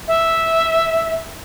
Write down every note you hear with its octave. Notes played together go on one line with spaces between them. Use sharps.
E5